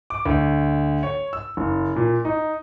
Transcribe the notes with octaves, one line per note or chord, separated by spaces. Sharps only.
D6
D2
C#5
E6
F#1
A#2
D#4